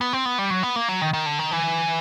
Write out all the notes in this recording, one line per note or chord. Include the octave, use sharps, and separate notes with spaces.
B3
C4
B3
G3
F#3
B3
A#3
F#3
D#3
D#3
D3
D#3
E3